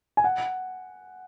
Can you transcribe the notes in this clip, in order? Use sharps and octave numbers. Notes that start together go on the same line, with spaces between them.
G#5
F#5